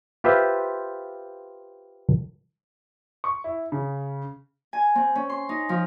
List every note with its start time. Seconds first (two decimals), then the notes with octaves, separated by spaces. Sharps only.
0.24 F4 G4 B4 C5 E5 F5
3.24 C#6
3.44 E4
3.72 C#3
4.73 G#5
4.95 C4
5.15 C#4
5.29 C6
5.49 D#4
5.69 F3